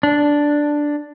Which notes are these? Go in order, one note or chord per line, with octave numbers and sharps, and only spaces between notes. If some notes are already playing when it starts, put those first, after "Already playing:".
D4